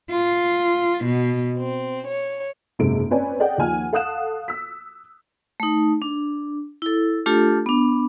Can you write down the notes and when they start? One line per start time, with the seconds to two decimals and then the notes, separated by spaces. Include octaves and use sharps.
0.10 F4
1.04 B2
1.58 C4
2.07 C#5
2.79 F#1 G#2 C3 G#3 A4 D7
3.10 C4 C#4 B4 C#5 D5 G#5
3.39 G#4 A4 D5 D#5 F#5 G5
3.58 D#2 F3 F#5 G#5 F6
3.93 A4 F5 F#5 D#6 F#6 E7
4.48 E6 B6
5.60 A3 D#4
6.02 D4
6.82 E4 A4
7.26 A3 D4 F4 G4 A4
7.66 B3 D4